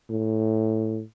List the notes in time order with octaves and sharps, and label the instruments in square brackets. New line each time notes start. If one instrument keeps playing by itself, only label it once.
[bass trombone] A2